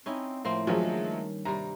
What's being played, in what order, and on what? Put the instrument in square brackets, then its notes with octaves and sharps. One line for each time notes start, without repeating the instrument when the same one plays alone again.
[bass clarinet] C4 [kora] C#4 D#4 E4
[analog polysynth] A2 F3 [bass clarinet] A3 [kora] A#3 C4
[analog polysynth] G2 D#3 [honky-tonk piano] F3 F#3 G#3 [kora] C#4
[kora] C3 G3 [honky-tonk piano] A#5